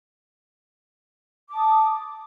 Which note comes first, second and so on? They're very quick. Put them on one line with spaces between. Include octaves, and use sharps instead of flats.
D6 A5 D#6